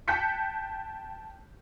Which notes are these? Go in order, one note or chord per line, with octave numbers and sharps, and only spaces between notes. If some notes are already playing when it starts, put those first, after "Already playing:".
G5 A5 F#6 G6 B6 C#7